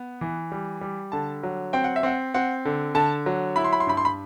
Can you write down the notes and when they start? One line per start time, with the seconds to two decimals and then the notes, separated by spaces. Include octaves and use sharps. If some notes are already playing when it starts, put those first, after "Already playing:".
Already playing: B3
0.21 E3
0.52 G3
0.81 G3
1.12 D3 A5
1.43 F#3
1.73 C4 G5
1.84 F#5
1.96 E5
2.03 C4 F#5
2.34 C4 F#5
2.65 D3
2.95 D3 A5
3.26 F#3
3.56 E4 B5
3.64 C6
3.73 B5
3.80 C6
3.87 G2 B5
3.97 C6
4.05 B5